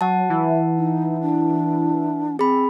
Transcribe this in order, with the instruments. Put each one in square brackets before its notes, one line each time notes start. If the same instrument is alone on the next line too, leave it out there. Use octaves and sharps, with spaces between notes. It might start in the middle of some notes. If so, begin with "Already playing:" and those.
[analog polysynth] F#3 [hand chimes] F#5 A5
[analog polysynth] E3 E4
[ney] D#4
D4
[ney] C4 [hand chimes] G#4 B5